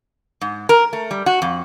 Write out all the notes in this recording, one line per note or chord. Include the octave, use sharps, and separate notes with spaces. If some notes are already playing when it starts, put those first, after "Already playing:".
G#2
A#4
A3
G3
F#4
F2